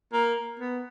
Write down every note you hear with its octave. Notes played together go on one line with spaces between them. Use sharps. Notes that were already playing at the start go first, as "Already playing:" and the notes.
A#3
B3